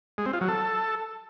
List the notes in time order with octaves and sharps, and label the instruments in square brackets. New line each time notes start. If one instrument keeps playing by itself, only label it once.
[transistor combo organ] G#3
C4
F4
F#3
A4